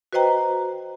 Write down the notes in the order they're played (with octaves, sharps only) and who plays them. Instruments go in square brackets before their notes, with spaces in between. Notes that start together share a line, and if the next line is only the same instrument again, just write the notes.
[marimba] F#4 B4 C5 D#5 G5 A#5